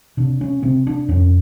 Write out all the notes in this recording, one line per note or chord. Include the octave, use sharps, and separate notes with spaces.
C3 D4
C#4
C3 C4
D4
F2 C#4